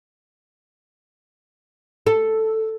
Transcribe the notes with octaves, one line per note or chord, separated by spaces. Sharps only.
A4